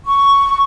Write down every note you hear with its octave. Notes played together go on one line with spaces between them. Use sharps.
C#6